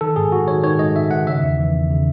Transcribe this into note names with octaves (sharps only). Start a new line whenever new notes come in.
D#3 A4
G#2 G#4
G#2 F#4
D#3 C#5
D#3 C#5
G#2 D#5
G#2 E5
D#3 F#5
C#3 E5
E2
E3
E2
C#3